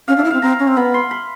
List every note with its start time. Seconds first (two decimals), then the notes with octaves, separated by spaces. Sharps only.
0.08 C#4 F5
0.17 D4 E5
0.24 E4
0.31 C4 F5
0.42 C4 A#5
0.59 C#4
0.67 C4
0.77 B3 B5
0.94 C6
1.11 B5